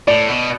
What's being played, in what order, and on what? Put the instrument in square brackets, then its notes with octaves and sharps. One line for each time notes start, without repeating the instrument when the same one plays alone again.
[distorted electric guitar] A2 [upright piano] D5
[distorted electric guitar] B2